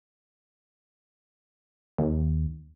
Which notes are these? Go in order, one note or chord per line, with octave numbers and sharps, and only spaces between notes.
D#2